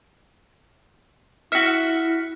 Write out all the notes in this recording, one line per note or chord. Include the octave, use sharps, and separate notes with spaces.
E4 F#4 E5 F6 B6 C#7